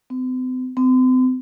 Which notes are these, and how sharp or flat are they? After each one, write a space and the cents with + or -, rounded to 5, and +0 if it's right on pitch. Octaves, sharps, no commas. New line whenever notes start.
C4 -45
C4 -40